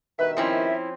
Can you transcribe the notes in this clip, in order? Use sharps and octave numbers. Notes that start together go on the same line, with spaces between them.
G2 B2 D#3 B4 E5
F3 C4 C#4 E4